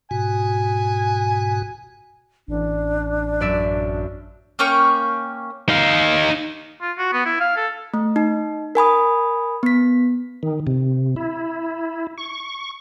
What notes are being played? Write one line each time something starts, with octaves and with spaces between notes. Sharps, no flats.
G#2 B2 F#4 G#5
A1 D4
F#2 D5 E5
A#3 C#4 G5 C#6
D#4 F5
F4
F#4
B3
E4
F5
A4
A3
D#4
A#4 G#5 B5 D#6
B3 B6
D#3
C3
E4
C#6